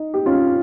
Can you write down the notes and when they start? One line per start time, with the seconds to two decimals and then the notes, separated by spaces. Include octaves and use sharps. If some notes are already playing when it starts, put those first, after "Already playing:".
Already playing: D#4
0.14 G4
0.26 C#4 F4